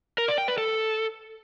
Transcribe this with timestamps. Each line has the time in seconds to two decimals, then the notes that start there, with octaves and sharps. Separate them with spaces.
0.18 A#4
0.28 D5
0.38 G5
0.48 B4
0.58 A4